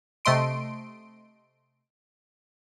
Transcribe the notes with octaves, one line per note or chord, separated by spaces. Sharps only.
C3 A3 D#5 C6 D7